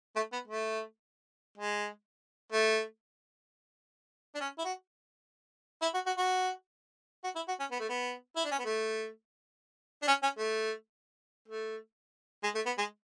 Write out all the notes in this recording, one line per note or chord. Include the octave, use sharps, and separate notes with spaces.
A3
B3
A3
G#3
A3
D4
C#4
E4
F#4
E4
F#4
F#4
F#4
F#4
E4
F#4
C#4
B3
A3
B3
E4
D4
C#4
B3
A3
D4
C#4
C#4
A3
A3
G#3
A3
B3
G#3